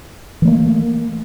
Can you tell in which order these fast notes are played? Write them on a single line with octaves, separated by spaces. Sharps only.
E3 A3 A#3